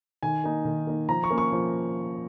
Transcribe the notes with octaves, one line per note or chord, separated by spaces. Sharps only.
D#3 G#5
A#3 D#4
D#3
A#3 D#4
F3 A#5
C#6
A#3 C#4
C#6
F3